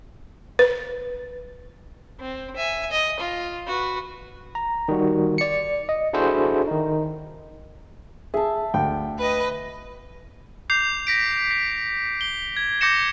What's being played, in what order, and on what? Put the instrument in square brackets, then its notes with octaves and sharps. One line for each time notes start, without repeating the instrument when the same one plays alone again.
[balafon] B4
[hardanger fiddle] C4
E5 G#5
D#5
F4
F#4 B4
[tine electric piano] A#5
D#3 G3 F#4
D5 C#7
D#5
D4 E4 F#4 G#4 A4 C5
D#3 D#4
[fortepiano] G#4 [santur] E5 A5
[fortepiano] D2 G5
[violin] B4 D#5
[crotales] D6 G6 C7 F7
A#6 B6 D7
B6
G7
G#6
D6 G6 A#6 C#7 E7